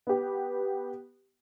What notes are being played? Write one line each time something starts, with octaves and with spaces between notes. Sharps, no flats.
B3 G4